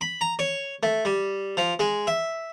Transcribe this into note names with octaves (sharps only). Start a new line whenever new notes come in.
B5
A#5
C#5
A3
G3
F3
G#3
E5